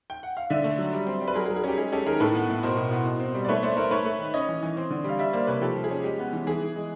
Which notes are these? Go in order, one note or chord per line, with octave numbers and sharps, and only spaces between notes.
G5
F#5
F5
D3 D5 E5
A3
F#3
G3
C4
G3
B4
F#3 G#4 A#4
G#4
F#3
G#4
C#4 G4
G#3 G#4
C#4 G4 A4
D#3 G#4 A#4
A2 A4 B4
B3
A2
B2 A#4 C5
B2
B3
B2
C4
G3
D5
A3 B4 C#5
A3 C5 D5
A3 A#4 C5
A3 B4 C#5
A3
D#3
C#4 C#5 D#5
E3
E3
C4
D3
G3 F5
G3 D5 E5
A#3 C5 D5
C3 B4 C#5
F3 G4 A4
F3
G#4
C#4
G#3 G4
B3
E3
E3 G#4
E3
G#3